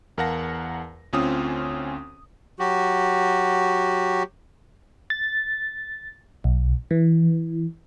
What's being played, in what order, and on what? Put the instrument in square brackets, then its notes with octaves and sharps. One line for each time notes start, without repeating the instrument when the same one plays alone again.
[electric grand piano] E2 A#4 F5 F#5 A5 A#6
D2 C4 C#4 F4 D#6
[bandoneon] F#3 F#4 G4
[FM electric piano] A6
B1
E3